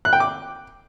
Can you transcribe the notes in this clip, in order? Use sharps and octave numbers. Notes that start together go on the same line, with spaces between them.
F#6
G5
D6